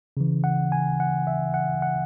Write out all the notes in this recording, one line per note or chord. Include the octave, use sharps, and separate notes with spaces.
C#3 E3
F#5
G#5
F#5
E5
F#5
F#5